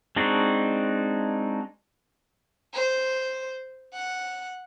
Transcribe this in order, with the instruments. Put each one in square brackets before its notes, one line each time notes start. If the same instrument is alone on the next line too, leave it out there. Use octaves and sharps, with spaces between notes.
[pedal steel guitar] G#3 C4 D4 D#4 F#4
[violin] C5
F#5